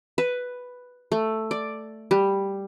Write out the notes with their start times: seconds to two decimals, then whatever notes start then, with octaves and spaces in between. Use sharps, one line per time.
0.18 B4
1.12 A3
1.51 D5
2.11 G3